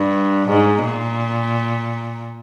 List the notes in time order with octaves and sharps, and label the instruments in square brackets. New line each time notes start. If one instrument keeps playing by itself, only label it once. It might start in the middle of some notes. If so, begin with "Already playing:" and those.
Already playing: [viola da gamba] G2
G#2
A#2